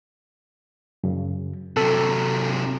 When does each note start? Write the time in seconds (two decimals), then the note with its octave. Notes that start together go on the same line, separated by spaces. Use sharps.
1.04 F#2 C#3
1.77 C3 F#3 A4